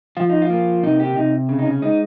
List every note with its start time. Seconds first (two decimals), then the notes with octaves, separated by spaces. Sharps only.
0.17 F3 F4
0.29 D#4
0.42 F4
0.50 A#3
0.83 C3 D#4
1.00 G4
1.15 C3 D#4
1.49 C#3
1.59 D#4
1.65 C#4
1.82 G#3 D#4